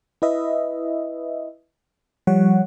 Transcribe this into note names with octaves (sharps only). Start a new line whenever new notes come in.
E4 B4 D#5 E5
F3 G3 C#5 F#5